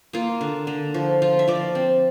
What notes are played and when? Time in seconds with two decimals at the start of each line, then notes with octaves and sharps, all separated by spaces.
0.13 A#3 F4
0.41 D3
0.67 D3
0.94 F3
1.22 F3 F4
1.39 E5
1.48 F3 D5
1.75 C4